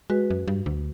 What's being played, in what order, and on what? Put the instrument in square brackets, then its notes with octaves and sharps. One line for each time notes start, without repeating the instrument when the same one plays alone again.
[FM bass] G#3 [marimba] F#4 B4
[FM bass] F#2
G2
D2